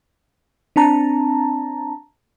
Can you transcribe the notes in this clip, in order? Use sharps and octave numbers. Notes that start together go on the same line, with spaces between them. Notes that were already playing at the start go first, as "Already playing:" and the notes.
C4 D4 A5 A#5